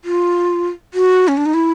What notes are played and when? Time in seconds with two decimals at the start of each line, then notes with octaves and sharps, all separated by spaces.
0.04 F4
0.94 F#4
1.28 C#4
1.37 D4
1.46 D#4
1.54 E4